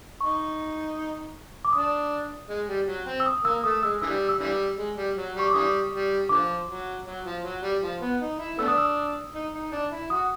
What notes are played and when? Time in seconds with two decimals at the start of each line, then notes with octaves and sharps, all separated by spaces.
0.21 D#4 C#6
1.65 D6
1.73 D4 D#6
2.49 G#3
2.68 G3
2.87 F#3
3.06 C4
3.20 E6
3.26 D#6
3.44 A#3 E6
3.64 A3 D#6
3.83 G#3 E6
4.02 D3 E3 G3 E6
4.29 E6
4.39 D3 E3 G3
4.78 G#3
4.96 G3
5.16 F#3
5.35 G3 C#6
5.47 D6
5.53 D3 E3 G3 D#6
5.92 G3
6.29 D3 F3 D6
6.68 F#3
7.06 F#3
7.25 F3
7.44 F#3
7.62 G3
7.82 F3
8.01 B3
8.21 D#4
8.39 E4
8.58 A3 B3 D4 E6
8.68 D#6
8.78 E6
9.34 D#4
9.53 D#4
9.72 D4
9.91 E4
10.10 F#4 D#6